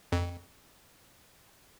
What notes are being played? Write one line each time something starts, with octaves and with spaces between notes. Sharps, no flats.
F2